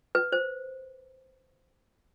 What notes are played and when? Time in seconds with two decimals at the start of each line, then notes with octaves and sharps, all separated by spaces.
0.15 B4
0.32 C5